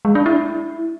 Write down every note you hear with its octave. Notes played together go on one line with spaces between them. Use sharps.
G#3
D4
E4